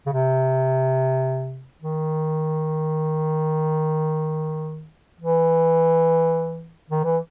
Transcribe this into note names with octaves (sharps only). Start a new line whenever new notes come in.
C#3
C3
D#3
E3
D#3
E3